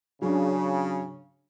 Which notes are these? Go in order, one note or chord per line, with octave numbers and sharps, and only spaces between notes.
C#3 F#3 D4